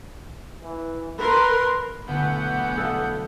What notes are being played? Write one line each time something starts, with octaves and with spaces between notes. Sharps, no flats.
E3
A#4 B4 C6
B1 D3 E3 A3 B3 F#5 B5 G6
A4 D#5 F5